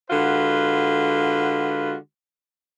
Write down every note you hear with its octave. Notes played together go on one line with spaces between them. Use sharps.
D3 G#3 F4 F#4 B4